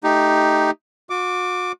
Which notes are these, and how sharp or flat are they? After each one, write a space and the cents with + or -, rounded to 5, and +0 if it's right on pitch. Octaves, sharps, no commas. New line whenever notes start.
A3 +0 D#4 +0 G4 +0
F#4 -40 D6 +0